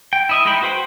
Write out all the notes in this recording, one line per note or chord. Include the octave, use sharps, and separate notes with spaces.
G5
E4 D#5 E5
G#3 D#4 E4 G5 B5
F#4 B4 C5 G5 B5